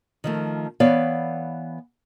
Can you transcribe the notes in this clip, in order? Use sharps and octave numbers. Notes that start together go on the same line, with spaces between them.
D#3 F3 A3
E3 B3 C#5 D5 F5